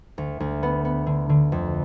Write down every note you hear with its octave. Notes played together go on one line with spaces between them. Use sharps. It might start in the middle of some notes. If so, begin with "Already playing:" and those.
D2
D2
B3
B3
D3
D3
F2